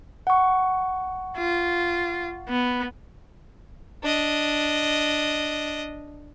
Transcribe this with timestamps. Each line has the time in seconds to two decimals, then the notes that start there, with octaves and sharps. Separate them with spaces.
0.27 F#5 C#6
1.37 F4
2.49 B3
4.03 D4 D#5